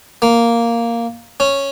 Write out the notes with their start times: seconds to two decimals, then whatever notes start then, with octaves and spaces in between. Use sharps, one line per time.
0.22 A#3
1.40 C#4